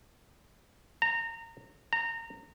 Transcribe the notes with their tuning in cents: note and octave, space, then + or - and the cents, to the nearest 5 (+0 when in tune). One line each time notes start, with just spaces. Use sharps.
A#5 -25
A#5 -25